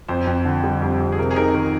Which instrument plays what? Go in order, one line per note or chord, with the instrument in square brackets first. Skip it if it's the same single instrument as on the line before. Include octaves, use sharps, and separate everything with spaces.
[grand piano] F2 [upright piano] C5
[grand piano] F2
D3
G3
F2
F2
[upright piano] G#4
[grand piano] C3 [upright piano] A#4
[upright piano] G#4
[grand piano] D#4 [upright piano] A#4
[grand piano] D#3 [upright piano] A#4